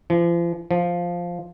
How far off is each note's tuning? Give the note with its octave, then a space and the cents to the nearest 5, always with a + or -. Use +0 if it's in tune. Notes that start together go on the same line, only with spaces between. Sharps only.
F3 -40
F3 +0